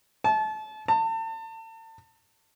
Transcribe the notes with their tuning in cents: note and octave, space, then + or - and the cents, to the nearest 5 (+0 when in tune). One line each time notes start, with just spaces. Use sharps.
A5 -30
A5 +35